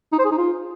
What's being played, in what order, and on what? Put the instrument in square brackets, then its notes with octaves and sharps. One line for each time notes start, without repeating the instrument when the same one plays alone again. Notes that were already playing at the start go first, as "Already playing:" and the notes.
[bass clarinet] D#4
C5
G#4
D#4
F4